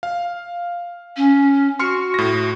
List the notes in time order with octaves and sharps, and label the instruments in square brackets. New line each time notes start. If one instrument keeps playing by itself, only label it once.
[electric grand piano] F5
[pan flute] C#4
[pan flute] F#4 [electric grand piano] C6 F6 C#7
[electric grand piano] A2 A#6